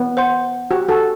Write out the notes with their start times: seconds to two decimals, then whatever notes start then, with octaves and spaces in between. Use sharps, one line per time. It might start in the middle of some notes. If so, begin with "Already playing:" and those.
Already playing: B3
0.17 C5 F#5 C6 G6
0.71 F#4 G4 C5 G5
0.88 F#4 A4